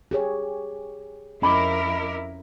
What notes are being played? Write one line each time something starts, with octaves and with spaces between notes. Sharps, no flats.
G4 G#4 C#5
F2 C#4 E4 A#4 D#5 B5 D6